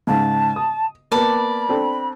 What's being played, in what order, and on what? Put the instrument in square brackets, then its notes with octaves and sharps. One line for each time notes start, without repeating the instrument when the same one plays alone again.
[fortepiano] G#2 C#3 [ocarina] A5
[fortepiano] D#6
[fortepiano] A#3 B3 [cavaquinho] D5 A5 [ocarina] B5
[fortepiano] C4 D4 A4